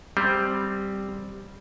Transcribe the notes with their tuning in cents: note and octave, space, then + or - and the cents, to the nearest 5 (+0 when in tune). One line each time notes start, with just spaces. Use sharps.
G3 +0 C4 +0